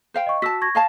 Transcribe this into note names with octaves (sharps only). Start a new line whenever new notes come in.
C5 F5 G5
D#5 C#6
F#4 A5 E6 B6
C#6 G#6 A#6
D#5 F5 A5